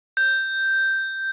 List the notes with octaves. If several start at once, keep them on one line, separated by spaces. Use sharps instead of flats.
G6